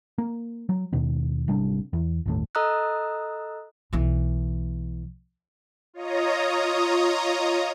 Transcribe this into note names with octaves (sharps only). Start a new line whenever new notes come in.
A#3
F#3
D#2 B2 D#3
G#1 C3 G3 D4
E2
G1 D#2 A2
A4 D#5 A#5 D#6 E6 F#6
B1 E3
F4 C#5 D#5 A#5 D#6